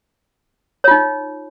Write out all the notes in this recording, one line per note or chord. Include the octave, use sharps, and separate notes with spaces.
D#4 F4 C#5